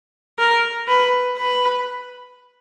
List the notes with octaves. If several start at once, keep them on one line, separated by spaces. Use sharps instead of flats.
A#4
B4
B4